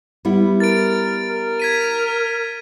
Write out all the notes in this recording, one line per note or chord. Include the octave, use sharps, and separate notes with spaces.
G3 B3 E4
A#4 A6 D7
A#4
G#6 B6 D#7